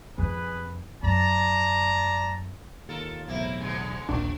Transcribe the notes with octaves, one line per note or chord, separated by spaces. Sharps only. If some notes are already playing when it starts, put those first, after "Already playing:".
F2 G#4 B4
F#2 D5 A5 A#5
D#2 F4 A4 A#4
B1 E2 A2 A#3 C4 E4
B2 D3 G#3
D#1 A#1 C3 D4